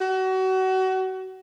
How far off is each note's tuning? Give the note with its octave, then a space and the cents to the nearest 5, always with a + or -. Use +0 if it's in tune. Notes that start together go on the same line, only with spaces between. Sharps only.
F#4 +30